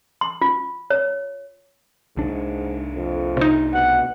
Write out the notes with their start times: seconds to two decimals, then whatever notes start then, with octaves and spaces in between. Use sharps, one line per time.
0.21 C6
0.41 F4
0.90 C#5
2.17 C2 G#2 D4
2.96 F2
3.37 C3 D#4
3.74 B2 F#5